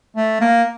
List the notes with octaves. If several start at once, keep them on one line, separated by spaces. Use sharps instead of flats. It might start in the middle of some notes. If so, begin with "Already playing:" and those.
A3
A#3